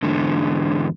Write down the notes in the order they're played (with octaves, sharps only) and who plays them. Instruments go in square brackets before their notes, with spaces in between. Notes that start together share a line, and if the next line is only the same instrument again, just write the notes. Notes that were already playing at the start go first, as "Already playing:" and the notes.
[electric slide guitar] E2 G#2 D3